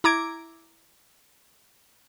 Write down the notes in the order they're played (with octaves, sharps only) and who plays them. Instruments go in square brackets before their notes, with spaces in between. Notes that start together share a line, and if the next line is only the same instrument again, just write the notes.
[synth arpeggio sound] E4 A#5 D6 G#6 D7